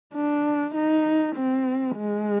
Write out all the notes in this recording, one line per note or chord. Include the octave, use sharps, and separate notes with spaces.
D4
D#4
C4
G#3